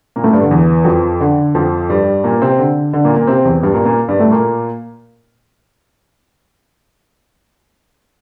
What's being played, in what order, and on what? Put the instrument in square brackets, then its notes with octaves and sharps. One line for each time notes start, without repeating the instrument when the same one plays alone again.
[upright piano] A#2 A#3
A2 A3
G2 G3
D3
E2 E3
F2 F3
D3
F2 F3
G2 G3
A#2 A#3
C3 C4
D3
D3
A#2 A#3
A#2 A#3
C3 C4
E2 E3
G2 G3
A#2 A#3
A#2 A#3
G2 G3
A2 A3
A#2 A#3